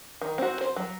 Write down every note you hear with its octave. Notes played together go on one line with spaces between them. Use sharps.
D#3
C4 F#4
C5
F#3